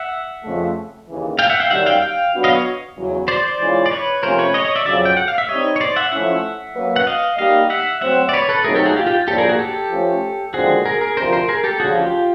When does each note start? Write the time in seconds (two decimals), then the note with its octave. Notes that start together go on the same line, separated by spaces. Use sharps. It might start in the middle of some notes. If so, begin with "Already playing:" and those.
Already playing: E5 F#5
0.44 F2 C#3 F3 A3
1.07 D#2 C#3 E3
1.39 F5 G5
1.50 E5 F#5
1.60 F5 G5
1.70 F#2 D#3 G3 E5 F#5
1.86 F5 G5
2.02 F5 G5
2.34 F#3 B3 D4 F#4
2.44 D#5 F5
2.54 C#5 D#5
2.97 E2 C#3 F#3
3.28 C5 D5
3.44 C5 D5
3.60 E3 G#3 C#4 F4
3.86 D5
3.91 B4 C#5
4.23 C3 F3 A3 C#4 A#4 C5
4.39 B4 C#5
4.54 C#5 D#5
4.64 C#5 D#5
4.75 D5 E5
4.86 F2 C#3 F#3 D5 E5
5.05 G5
5.17 F#5
5.28 F5
5.38 E5
5.49 G3 C4 D#4 C#5 D#5
5.76 C#5
5.81 C5 D5
5.96 E5 F#5
6.12 F3 A3 C#4 E4 E5 F#5
6.75 F#3 A#3 C#4 F#4 B4
6.96 F#5
7.07 D#5 F5
7.38 G3 A#3 D#4 G4 D#5 F5
7.70 E5 F#5
8.01 F#3 A3 C4 E5 F#5
8.29 D5
8.33 B4 C#5
8.49 A4 B4
8.64 F#3 A3 C4 D#4 G#4 A#4
8.75 G4 A4
8.85 F#4 G#4
8.96 F4 G4
9.06 F4 G4
9.28 A2 F3 A#3 D4 G4 A4
9.38 G#4 A#4
9.49 F#4 G#4
9.59 G4 A4
9.91 F3 A3 C#4
10.54 D#2 D3 F3 G#3 C4 F#4 G#4
10.85 G#4 A#4
11.01 G#4 A#4
11.17 D2 C3 F3 A#4 C5
11.33 A#4 C5
11.49 G#4 A#4
11.64 G4 A4
11.80 D2 C#3 F3 F#4 G#4
11.95 F4 G4